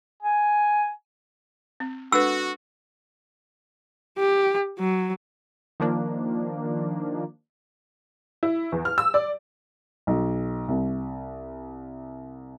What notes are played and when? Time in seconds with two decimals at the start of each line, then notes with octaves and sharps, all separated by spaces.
0.23 G#5
1.80 C4
2.12 D4 F#4 A4 B4 E6
4.18 G4
4.79 F#3
5.80 D#3 F3 A#3 D4
8.43 E4
8.72 E2
8.85 F6
8.98 E6
9.14 D5
10.07 B1
10.68 C2